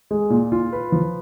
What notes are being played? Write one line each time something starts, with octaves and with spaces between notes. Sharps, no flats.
G#3
A#2
F4
B4
F3